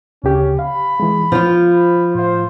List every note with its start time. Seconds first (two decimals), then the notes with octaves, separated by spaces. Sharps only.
0.24 D2 C#3 C#4 G4
0.59 F5 B5
1.00 E3 G#3
1.32 F3 F4 C5
1.73 B5
2.15 A2 C5 F5